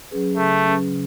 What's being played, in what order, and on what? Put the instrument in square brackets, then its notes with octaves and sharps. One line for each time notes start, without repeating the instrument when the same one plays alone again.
[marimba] F#3 C#4 G#4 B4
[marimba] C#3 [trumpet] A3
[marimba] F#3 C#4 G#4 B4
C#3